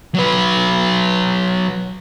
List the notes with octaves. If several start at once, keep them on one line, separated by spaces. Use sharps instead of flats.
F#3 B4